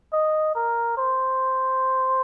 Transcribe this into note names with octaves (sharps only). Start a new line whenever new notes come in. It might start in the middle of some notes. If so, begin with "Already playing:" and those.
D#5
A#4
C5